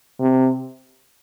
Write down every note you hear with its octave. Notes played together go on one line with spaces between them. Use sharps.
C3